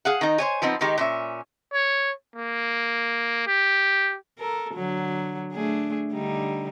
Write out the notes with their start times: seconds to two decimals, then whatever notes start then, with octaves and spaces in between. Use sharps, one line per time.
0.05 G#4 F5 F#5
0.21 D#3 D#4
0.38 C5 C#5 G#5
0.62 F3 B3 C4 D#4
0.81 D#3 G#3 D#4 G4
0.98 A#2 C#4 E5
1.73 C#5
2.36 A#3
3.47 G4
4.39 A4 A#4
4.74 D3 F#3
5.53 A3 D4 G#4
6.13 D3 G3 D#4